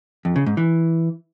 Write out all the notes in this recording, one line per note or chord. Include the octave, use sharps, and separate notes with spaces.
F2
C#3
G#2
E3